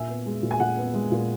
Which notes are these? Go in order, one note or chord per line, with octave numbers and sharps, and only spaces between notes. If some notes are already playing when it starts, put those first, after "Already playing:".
Already playing: A#2 E5 G#5
B3
G#3
A#2
G#5
A#2 F#5
B3
G#3
A#2